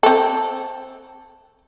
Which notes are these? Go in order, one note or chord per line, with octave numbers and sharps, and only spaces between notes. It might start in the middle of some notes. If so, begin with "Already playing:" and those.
C4 A4